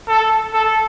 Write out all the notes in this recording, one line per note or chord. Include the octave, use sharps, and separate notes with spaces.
A4
A4